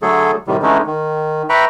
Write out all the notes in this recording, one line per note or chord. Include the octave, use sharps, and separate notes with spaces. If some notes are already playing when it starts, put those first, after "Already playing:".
D3 F#3 A3 G#4 A4
A2 C3 D#3 G3
D3 E3 G#3 A3 C#4 D#4
D#3
B4 E5 G5 A#5 B5 C#6